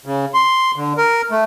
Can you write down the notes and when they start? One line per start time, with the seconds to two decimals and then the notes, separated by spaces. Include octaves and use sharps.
0.06 C#3
0.34 C6
0.76 D3
0.97 A#4
1.31 A3